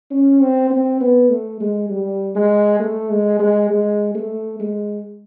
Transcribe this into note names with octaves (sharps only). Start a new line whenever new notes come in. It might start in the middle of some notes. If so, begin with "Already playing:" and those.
C#4
C4
C4
B3
A3
G#3
G3
G#3
A3
G#3
G#3
G#3
A3
G#3